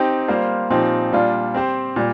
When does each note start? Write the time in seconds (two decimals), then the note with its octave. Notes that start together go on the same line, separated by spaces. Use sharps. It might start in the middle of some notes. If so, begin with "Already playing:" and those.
Already playing: C4 D#4 G4
0.28 G3 A#3 F4 C5 F5
0.70 A#2 F3 C4 D#4 G4
1.13 A#2 G3 D4 F4
1.54 C4 G4 C5
1.96 A#2 G3